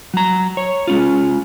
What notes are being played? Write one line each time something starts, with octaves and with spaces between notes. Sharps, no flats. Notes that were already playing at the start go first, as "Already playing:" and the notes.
F#3 A#5
C#5
G#3 C#4 F4